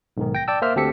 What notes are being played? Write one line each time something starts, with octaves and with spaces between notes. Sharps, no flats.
B1 G#2 D#3
G5 A#6
D5 G5 A5 E6
A#3 C5 E5 F6
D2 C4 G4 A4 B6 C#7